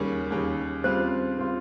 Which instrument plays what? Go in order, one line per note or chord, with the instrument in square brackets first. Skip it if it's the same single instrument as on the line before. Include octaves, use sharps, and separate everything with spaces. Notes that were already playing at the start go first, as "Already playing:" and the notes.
Already playing: [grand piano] D#2 C#3 G3 C#4 [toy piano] A#4
[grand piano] D#2 C#3 G3 C#4
[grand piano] C#3 G3 C4 F4 [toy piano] C5
[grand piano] C#3 G3 C4 F4